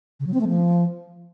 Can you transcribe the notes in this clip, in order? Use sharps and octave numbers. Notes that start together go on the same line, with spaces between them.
C#3
F#3
C4
A3
F3